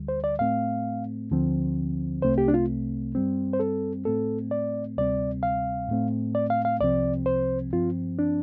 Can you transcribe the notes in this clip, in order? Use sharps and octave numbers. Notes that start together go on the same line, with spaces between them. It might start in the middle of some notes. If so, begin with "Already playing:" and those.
Already playing: D2 D3 G3
C5
D5
A2 A3 C4 F5
D2 D3 F3 C4
C2 C3 A3 C4 C5
G4
D4
F4
G2 G3 C4
C5
A4
A2 A3 C4 A4
D5
D2 C3 G3 C4 D5
F5
A2 A3 C4
D5
F5
F5
C2 C3 F3 C4 D5
C5
G2 F3 C4 F4
D4